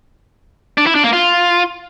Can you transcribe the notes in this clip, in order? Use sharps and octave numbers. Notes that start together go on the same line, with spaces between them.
D4
E4
D4
A#3
F4